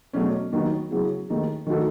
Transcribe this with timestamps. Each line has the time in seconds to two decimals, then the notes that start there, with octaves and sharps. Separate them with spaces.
0.13 E2 B2 F#3 A3 C#4
0.52 D#2 D#3 F#3 B3 D#4
0.91 C#3 F#3 B3 E4 G#4
1.28 D#2 D#3 A3 D#4 G#4
1.67 D#3 A3 D#4 F#4 A4